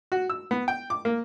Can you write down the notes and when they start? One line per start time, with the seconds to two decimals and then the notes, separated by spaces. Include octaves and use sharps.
0.12 F#4
0.30 E6
0.51 B3
0.68 G5
0.90 D6
1.05 A#3